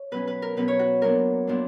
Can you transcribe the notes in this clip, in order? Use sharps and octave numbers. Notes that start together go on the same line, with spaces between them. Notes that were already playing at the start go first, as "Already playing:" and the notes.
Already playing: C#5
B2 F#3 C#4 B4
B4
A#4
B2 F#3 C#4 B4
C#5
F#4
A#2 F#3 B3 D4 A#4
A#2 F#3 B3 D4